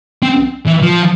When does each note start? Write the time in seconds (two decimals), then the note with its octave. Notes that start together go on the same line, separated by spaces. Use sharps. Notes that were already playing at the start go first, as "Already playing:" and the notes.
0.22 C4
0.67 E3
0.83 F3